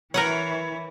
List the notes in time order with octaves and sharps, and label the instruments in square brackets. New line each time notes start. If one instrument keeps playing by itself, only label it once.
[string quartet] E3 E4 [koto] A#4 B4 F#5 [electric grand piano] C#5